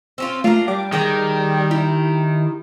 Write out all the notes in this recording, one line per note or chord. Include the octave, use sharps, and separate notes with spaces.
C4 C#4 F4
A3 D4 F4 A#4
G3 D6
D#3 G#4 G5 A#5
E4 G4